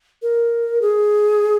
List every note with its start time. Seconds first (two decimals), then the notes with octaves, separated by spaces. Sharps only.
0.22 A#4
0.82 G#4